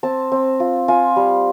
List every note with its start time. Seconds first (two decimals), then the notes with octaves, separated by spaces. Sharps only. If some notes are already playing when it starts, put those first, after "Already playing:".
0.03 C4 A5
0.32 C4
0.60 F4
0.88 F4 G#5
1.16 G3